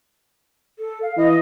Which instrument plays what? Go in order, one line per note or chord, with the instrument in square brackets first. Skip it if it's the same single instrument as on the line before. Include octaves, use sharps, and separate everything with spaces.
[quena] A4
F5
[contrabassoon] E3 [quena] D#5